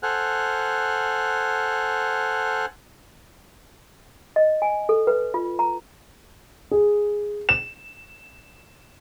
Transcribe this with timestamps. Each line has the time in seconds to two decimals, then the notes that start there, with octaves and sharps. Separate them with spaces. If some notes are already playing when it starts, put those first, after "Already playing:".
0.03 A4 C5 F#5 G#5 F6 F#6
4.36 D#5
4.62 G#5
4.89 A4
5.07 B4
5.34 F4
5.59 A#5
6.71 G#4
7.49 E7